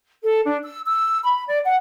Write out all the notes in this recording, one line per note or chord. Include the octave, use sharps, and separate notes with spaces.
A4
D4
E6
E6
B5
D5
F#5